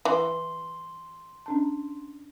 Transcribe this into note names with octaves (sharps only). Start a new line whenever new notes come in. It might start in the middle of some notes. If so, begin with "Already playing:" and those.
E3 C6
C#4 D4 A5